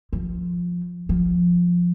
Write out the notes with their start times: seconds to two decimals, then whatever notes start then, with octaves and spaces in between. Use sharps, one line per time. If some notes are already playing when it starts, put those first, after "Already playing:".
0.13 F3
1.09 F3